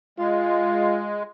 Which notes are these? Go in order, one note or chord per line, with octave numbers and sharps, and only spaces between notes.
G#3 F4